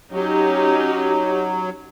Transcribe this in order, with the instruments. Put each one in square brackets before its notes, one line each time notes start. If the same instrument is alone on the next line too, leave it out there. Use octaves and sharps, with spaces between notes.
[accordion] F#3 [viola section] C#4 D#4 G4